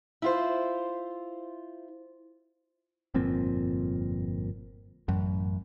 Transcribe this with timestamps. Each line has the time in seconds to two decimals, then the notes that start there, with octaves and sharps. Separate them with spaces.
0.22 E4 F4 C5
3.14 G1 F2 A#2 C4
5.08 A1 F#2